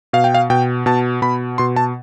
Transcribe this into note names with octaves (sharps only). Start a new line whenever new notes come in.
B2 F5
G5
F5
B2 G5
B2 A5
B2 B5
B2 C6
A5